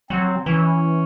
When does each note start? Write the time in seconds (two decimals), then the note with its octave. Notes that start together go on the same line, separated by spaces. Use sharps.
0.10 F#3 C4
0.46 E3 C#4